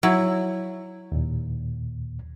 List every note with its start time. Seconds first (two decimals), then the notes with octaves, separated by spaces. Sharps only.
0.03 F#3 E4
1.12 D#2 A#2